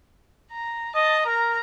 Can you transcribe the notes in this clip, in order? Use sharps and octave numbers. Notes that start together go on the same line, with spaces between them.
A#5
D#5 A5
A#4 A#5